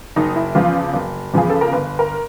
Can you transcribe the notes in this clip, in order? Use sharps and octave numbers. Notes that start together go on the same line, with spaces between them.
F#1 D#4
E4
E2 C#3 F3 F4
F#1
E2 C#3 F3 G#4
A4
A#4
G1 B4
A#4